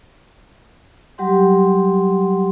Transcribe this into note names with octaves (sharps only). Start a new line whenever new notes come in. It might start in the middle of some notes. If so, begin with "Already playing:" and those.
F#3 G3 G4 F#5 C6